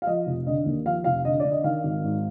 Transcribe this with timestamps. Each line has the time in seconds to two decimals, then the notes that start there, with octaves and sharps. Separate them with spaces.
0.02 F5
0.07 F3 D#5
0.26 F1
0.46 D3 D#5
0.66 D#2
0.85 F3 F5
1.04 F1 F5
1.25 D3 D#5
1.40 D5
1.45 D3
1.52 D#5
1.64 D#3 F5
1.84 G#1
2.04 G#2